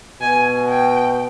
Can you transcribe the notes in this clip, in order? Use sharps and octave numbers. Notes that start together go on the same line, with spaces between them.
B2 G#5
G5